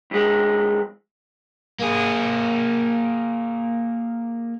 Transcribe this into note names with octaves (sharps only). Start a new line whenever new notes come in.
F2 G#3
A#3 G#4